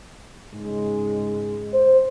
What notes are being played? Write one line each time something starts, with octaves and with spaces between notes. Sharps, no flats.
G#2 C#3 G#3
C5